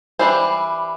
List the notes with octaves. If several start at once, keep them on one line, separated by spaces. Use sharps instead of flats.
E3 G3 D4 C5